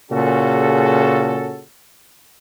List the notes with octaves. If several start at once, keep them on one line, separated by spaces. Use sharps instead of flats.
A#2 C#3 C#4 F#4 G#4 A4